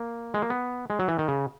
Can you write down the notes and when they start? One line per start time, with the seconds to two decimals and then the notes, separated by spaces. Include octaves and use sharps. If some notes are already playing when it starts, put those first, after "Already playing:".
Already playing: A#3
0.34 G#3
0.42 A#3
0.50 B3
0.90 G#3
0.99 F#3
1.08 E3
1.19 D#3
1.28 C#3